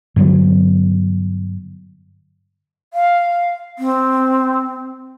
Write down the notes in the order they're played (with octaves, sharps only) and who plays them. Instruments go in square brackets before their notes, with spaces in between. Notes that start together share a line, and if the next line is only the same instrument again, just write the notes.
[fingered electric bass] G2 D3 F#3 B3
[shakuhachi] F5
C4